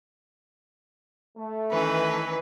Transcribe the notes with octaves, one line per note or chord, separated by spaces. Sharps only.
A3
D#3 E3 C#4 B4